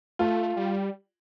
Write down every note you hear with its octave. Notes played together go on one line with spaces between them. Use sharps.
A3 F4
G3